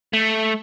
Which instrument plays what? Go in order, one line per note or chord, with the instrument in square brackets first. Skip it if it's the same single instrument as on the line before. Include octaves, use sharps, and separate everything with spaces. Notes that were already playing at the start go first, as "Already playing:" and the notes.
[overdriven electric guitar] A3